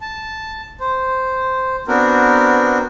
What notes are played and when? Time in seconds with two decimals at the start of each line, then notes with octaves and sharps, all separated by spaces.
0.01 A5
0.80 C5
1.88 B3 C4 D4 F#4 A#4